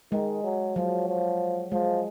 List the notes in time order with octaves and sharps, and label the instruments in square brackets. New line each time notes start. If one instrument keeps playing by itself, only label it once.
[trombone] D#3 [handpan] G#3
[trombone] F#3
[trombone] F3 [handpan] F#3
[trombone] F3
[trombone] F3 [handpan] G#3